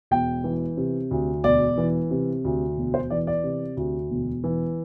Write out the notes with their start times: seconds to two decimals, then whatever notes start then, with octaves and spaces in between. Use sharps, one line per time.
0.11 E1 G5
0.44 E3
0.77 C3
1.11 D2
1.44 E1 D5
1.78 E3
2.11 C3
2.45 D2
2.77 E1
2.94 C5
3.10 E3 D5
3.27 D5
3.44 C3
3.77 D2
4.10 E1
4.44 E3